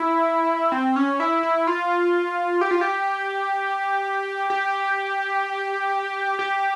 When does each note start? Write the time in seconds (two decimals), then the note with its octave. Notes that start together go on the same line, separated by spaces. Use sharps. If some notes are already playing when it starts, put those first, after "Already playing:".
Already playing: E4
0.72 C4
0.96 C#4
1.20 E4
1.43 E4
1.67 F4
2.61 G4
2.71 F4
2.81 G4
4.50 G4
6.39 G4